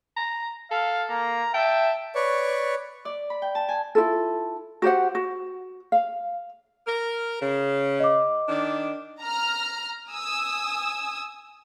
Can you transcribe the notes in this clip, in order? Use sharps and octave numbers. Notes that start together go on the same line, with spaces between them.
A#5
A4 F5
A#3 A#5
E5 G5 A5
B4 C#5 D5 C#6
D5
B5
G5
A5
G#5
E4 F4 A4
F#4 G4 C5 F#5
F#4
F5
A#4
C#3
D#5 D6
D#3 D4
A#5 F6
G#5 D#6 E6